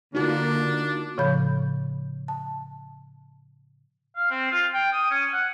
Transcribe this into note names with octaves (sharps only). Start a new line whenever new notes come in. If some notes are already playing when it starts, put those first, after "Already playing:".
D3 A#3 D4 D#4 F4 F#4
A2 C#3 F3 C#5 B5 G6
A5
F5
C4
F4
G5
D#6
C#4
F#5